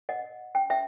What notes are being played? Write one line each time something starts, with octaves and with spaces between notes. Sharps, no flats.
D#5 F#5
G5
E5 G5